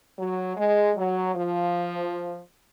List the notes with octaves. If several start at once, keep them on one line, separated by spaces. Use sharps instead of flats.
F#3
G#3
F#3
F3